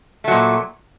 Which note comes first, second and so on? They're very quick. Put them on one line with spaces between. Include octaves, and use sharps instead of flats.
A3 F#3 A#2